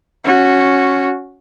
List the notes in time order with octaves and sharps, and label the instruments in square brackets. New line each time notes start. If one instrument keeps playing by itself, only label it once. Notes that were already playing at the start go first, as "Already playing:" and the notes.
[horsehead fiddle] C#4 F#4